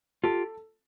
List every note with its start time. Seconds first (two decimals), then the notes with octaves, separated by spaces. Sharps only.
0.23 F4 G4 A4